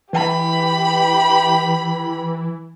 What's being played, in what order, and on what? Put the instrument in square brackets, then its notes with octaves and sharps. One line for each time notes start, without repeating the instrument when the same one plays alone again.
[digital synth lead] E3 [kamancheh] G4 B5